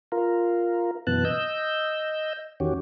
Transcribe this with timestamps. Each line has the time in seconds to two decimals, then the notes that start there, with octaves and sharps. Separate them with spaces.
0.12 F4 A#4
1.07 F#2 B2 E3 B3 A5 F#6
1.25 D#5 E6 G6
2.60 E2 D#3 C#4 F#4 G4